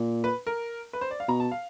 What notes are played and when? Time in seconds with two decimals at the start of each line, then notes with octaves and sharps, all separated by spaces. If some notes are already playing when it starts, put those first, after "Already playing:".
Already playing: A#2
0.24 B4
0.47 A#4
0.93 B4
1.01 C5
1.11 D5
1.20 F5
1.28 B2 A#5
1.40 A5
1.51 F5